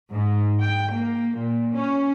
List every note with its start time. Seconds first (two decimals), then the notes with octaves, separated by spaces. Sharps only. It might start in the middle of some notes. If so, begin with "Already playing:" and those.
0.12 G#2
0.59 G5
0.94 A#3
1.37 A#2
1.75 C#4